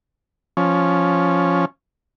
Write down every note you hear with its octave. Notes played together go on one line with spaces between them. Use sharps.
F3 C#4